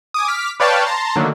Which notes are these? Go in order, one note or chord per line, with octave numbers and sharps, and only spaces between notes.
G#5 D6 D#6
D6 F6 B6
B4 C#5 D5 F5 G5 A5
A5 A#5 C6
D3 D#3 F#3 A3 A#3